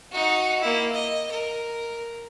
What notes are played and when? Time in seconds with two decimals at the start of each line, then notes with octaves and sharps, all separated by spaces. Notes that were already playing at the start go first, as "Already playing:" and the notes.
0.12 D#4 F#4
0.61 A#3 E4
0.92 D#5
1.31 A#4